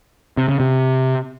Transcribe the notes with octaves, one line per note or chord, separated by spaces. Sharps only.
C3
C#3
C3